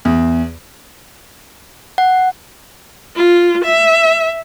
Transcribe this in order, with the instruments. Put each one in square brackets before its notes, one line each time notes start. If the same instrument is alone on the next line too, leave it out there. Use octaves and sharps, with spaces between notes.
[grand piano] E2
[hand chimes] F#5
[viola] F4
E5